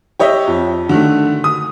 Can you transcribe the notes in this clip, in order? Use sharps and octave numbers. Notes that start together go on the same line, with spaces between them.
G4 C#5 D#5 E5
F2
D3 D#3 A3
D#6